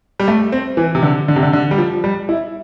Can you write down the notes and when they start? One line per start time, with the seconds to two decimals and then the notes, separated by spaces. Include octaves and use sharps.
0.20 G3
0.28 A3
0.52 C4
0.77 E3
0.95 C3
1.02 D3
1.28 D3
1.36 C3
1.43 D3
1.53 D3
1.71 G3
1.78 F3
2.04 G3
2.29 E4